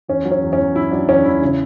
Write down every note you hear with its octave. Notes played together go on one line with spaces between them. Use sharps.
E2 C#4
F#3
C#4
E2
C#4
E2
F#3 E4
F#3 D4
E2 C#4
E2 E4
C#3